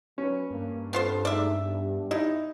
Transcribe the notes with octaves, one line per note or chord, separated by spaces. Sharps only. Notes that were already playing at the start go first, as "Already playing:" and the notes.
F#3 C#4 B4
G2 A#3
B3 C4 F4 A4 C5
G#3 A3 D#4 D5 E5
B3 D4 G4
D#4 E4